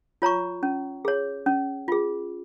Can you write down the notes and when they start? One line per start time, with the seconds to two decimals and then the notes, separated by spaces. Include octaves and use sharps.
0.22 F4 C#5 A#5 C#6
0.63 C#4
1.05 G#4 C#5
1.46 C#4
1.88 F4 G#4